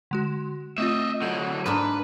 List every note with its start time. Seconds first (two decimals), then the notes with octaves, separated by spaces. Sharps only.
0.11 D3 G#3 F#4
0.78 A3 C4 F4 D#5 E5
1.22 D3 F#3 G6
1.66 G#2 A#3 D4 B4